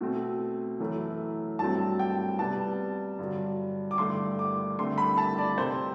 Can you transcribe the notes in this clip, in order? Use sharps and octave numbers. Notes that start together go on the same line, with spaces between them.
B2 A3 C4
F#2 E3 A3
G2 F#3 A3 C4 A5
G5
C3 G3 B3 A5
G2 D3 F#3
D6
G2 D3 A3 C6
D6
G2 D3 A3 C4 C6
B5
A5
D5
C3 G3 C4 C5